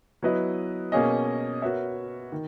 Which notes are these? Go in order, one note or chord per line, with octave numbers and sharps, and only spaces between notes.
F#3 B3 E4 B4 D#5
B2 A#3 C#4 G#4 D#5
B3 F#4 A#4 C#5 E5
D#3